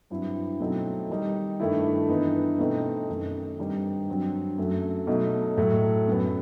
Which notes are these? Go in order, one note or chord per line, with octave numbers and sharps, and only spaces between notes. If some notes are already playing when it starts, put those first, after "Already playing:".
G2 F#3 C4 E4
B2 F#3 A3 C4 D#4
D#3 G3 D#4
G2 D#3 A3 E4
G2 E3 B3 D#4
B2 A3 C4 D#4
F#2 D#3 A3
G2 D#3 G3 C4 D#4
G2 F#3 C4
F#2 F#3 A3
B2 F#3 A3 D#4
A2 F#3 A3
F#2 F#3 B3